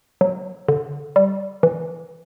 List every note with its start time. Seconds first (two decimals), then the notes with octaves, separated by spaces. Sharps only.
0.21 F#3
0.68 D3
1.16 G3
1.63 E3